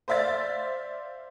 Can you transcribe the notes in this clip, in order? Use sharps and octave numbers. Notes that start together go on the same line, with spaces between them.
C5 D5 E5 F5 A6